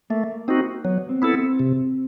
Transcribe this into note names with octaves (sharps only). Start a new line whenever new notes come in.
A3 A#3
C4 D#4 F#4
F#3 B3
C4
B3 E4 A4
C4
C3